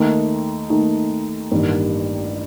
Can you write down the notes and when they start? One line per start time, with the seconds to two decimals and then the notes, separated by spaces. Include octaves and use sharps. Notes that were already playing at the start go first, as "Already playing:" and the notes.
Already playing: D#2 D#3 A3 D#4
0.70 D#2 D#3 A3 D#4
1.51 A1 G2 D#3 G3 A#3